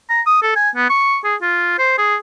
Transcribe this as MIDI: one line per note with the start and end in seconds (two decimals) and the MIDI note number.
0.09 0.21 82
0.26 0.38 87
0.42 0.54 69
0.56 0.70 80
0.75 0.89 59
0.90 1.17 85
1.24 1.35 68
1.41 1.78 65
1.78 1.94 72
1.98 2.16 68